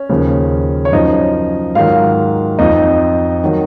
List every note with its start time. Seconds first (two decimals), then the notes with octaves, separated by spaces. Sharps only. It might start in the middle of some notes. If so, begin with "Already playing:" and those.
Already playing: C#4
0.09 D#2 C#3 F3
0.85 C#5
0.92 F#2 F3 D#4 D#5
1.75 G#2 D#3 F#3 F4 F5
2.59 F2 F3 D#4 D#5
3.44 D#3 F#3